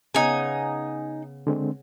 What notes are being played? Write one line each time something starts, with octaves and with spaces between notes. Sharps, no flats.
C#3 B3 D#4 G#5
D3 G#3 C4